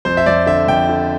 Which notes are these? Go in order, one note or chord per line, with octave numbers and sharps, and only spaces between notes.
F2 C5
E5
F2 D5
D3 E5
F2 G5
D3